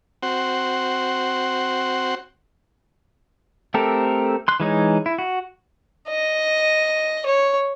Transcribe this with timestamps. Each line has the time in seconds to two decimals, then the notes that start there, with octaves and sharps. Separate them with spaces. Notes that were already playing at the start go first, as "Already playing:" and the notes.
0.23 C4 F#4 C5 F#5
3.74 A3 C4 G4 A4 A#4
4.48 C6 F#6
4.60 E3 G#3 D#4 C#5
5.06 E4
5.18 F#4
6.09 D#5
7.26 C#5